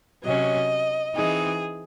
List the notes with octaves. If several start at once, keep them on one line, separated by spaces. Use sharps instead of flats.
C3 F#3 C#4 D#5
E3 C4 D#4 G#4